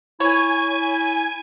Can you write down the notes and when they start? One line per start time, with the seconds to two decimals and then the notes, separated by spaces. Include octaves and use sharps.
0.20 E4 C#5 G#5